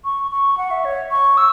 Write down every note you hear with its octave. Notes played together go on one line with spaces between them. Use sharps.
C#6
C#6
F#5
E5
C#5
C#6
E6